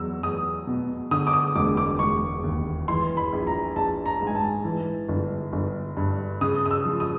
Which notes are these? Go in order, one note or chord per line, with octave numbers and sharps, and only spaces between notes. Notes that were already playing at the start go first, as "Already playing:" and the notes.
Already playing: E2 F#3 E6
E2 D#6
B2
D3 D#6
D6
D#6
E1 D6
D6
E1 C#6
D#2
E3 C6
B5
A#1
A#5
A#1 A5
A#5
G#2
G#5
A5
E3
G1
G1
G2
C#3 D#6
D#6
E6
F3
D#6